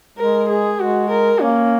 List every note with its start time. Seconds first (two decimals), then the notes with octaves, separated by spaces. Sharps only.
0.18 G#3 A#4
0.49 G#4
0.79 G#3 F#4
1.10 A#4
1.41 A#3 C#4